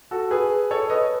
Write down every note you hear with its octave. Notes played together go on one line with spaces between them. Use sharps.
F#4 A4
G#4 B4
A4 C#5
B4 D#5